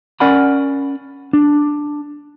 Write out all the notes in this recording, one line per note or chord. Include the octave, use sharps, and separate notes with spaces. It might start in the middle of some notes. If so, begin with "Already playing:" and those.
C#4 A#4 D5 F#5 G#5 B5
D4